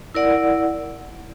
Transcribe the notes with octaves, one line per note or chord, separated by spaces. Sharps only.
E4 A#4 D5 F#5